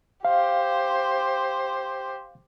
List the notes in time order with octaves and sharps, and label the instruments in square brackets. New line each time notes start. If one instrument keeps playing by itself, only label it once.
[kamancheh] G4 C5 [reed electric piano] F5